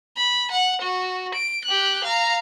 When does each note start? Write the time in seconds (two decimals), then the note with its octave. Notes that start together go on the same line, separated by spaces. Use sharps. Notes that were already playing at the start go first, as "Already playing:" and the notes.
0.17 B5
0.51 F#5
0.82 F#4
1.34 D7
1.65 G4 F#6
2.04 F5 A#5